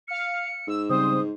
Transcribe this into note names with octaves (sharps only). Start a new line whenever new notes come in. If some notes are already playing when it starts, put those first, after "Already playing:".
F5 F6 C#7
G#2 E6
C#3 G3 C4 C5 D#6